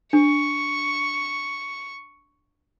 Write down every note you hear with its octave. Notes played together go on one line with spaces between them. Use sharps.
D4 C#6